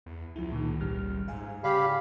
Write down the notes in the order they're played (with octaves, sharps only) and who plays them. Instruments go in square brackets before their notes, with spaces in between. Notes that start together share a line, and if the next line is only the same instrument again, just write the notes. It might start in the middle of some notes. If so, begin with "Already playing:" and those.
[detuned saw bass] E2
[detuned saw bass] C#2 [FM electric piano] F3 E4
[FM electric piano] A#2 D#3
G#1 G3 F6
[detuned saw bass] G#2 [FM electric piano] F5 G#5
[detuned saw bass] C#3 [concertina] G4 F5 B5 [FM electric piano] D5 F#5 G#5